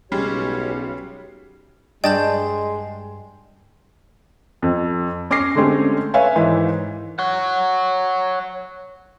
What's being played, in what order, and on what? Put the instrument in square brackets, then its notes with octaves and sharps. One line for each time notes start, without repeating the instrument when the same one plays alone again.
[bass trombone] B1 [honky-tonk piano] C#3 G3 G#3 [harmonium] G4 C#5
[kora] G2 [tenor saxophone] G#3 [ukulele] D5 D#5 [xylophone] G5 A5 G6
[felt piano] F2
C#4 D6 F6 A#6 C7
D3 G#3 A3 C4 C#4 G4
B4 C#5 E5 F5 G#5
G#2 D#3 E3
[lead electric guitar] C#5 F#5